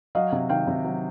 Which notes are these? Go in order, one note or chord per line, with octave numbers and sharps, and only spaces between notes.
F#3 D#5 F5
C3
D#3 F5 G5
C3
F#3